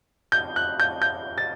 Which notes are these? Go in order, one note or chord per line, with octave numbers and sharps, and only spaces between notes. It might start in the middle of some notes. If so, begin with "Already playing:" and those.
G6
F#6
G6
G6
A6